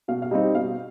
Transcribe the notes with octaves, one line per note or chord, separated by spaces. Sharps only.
B2 F5
F5
G3 C4 D#4 D#5
B2 F5